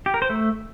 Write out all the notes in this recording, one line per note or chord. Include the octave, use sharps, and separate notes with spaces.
G4
A#4
C5
A3